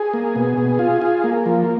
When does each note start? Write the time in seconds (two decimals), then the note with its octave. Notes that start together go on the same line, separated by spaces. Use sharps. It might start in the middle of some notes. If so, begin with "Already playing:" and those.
Already playing: G#4
0.13 A#3
0.36 B2
0.58 B2
0.79 F4
1.02 F4
1.24 A#3
1.46 F3